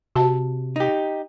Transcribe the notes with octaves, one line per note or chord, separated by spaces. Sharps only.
C3 F#4 A5
D#4 G4